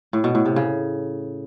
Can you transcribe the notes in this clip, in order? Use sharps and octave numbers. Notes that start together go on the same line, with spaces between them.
A2
B2
A2
C3
C#3